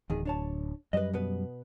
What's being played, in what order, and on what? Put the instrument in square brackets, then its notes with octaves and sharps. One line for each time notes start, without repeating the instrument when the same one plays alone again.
[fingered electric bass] D1 [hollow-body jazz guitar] E2 D#3 G#4
[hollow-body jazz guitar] D4 C#5 A5
[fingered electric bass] F#2 G3 [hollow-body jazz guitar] B4 C5 D#5
[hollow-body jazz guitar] B2 B3 B4